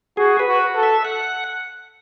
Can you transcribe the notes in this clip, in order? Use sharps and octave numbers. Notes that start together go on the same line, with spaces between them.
F#4 G#4
B4
F#4
A4
E5
F#5